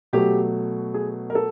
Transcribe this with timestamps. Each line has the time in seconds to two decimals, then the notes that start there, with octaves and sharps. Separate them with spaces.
0.13 B2 F#3 A3 G4
0.94 G#4
1.30 A#4
1.35 A4